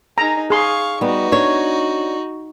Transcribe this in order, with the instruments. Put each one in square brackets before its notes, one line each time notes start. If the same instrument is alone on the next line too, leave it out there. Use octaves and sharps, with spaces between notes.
[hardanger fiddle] D#4 G#4 [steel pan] A#5
[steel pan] G#4 C6 [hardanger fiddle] F5 C#6
[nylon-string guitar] G3 B3 [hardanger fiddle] D#4 F#4
[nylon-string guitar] D4 C#5